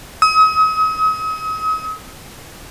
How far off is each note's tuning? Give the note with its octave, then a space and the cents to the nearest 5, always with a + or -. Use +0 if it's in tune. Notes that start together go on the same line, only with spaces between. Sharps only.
D#6 +40